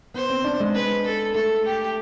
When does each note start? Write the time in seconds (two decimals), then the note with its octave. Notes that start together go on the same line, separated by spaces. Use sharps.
0.14 B3 C5
0.30 C4
0.44 D4
0.60 G#3
0.74 B4
1.05 A4
1.35 A3 A4
1.65 G4